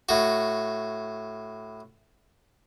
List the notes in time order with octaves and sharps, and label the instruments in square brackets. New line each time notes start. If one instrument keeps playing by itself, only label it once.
[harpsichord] A2 F#4